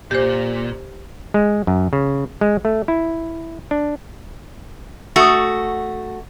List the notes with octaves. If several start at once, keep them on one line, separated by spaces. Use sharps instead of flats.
A#2 G4 C5
G#3
F#2
C#3
G#3
A3
E4
D4
A3 F#4 C#6 D#6